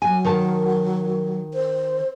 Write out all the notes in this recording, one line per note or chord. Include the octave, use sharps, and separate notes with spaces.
F#3 G#5
D#3 A#4 A5
C5